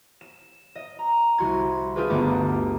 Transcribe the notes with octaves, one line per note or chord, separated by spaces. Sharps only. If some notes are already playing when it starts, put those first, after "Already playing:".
E7
D#5
A#5
C2 F#4 C6 G#6
D4 F4 G4 G#4 B4
G1 D2 A3 B3 D6